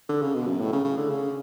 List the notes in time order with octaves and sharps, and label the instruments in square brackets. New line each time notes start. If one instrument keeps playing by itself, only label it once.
[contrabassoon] D3
C#3
B2
F#2
A2
C#3
C#3
D3
C#3